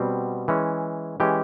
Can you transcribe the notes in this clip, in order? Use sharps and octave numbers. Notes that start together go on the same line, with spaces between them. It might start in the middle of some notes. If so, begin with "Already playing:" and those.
Already playing: B2 G3 C4
E3 G#3 C#4
E3 G#3 C#4 G4